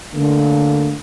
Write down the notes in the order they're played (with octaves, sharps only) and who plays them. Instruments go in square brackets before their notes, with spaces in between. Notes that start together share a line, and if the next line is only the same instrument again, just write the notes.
[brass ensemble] D3 A3 A#3